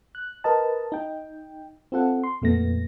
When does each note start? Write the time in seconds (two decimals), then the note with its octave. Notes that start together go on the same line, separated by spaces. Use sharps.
0.15 F#6
0.44 A#4 B4 D#5 A5
0.92 D#4 G5
1.92 C4 F4 A4 F#5
2.24 C6
2.42 F2 A#2 A3 B3 A#6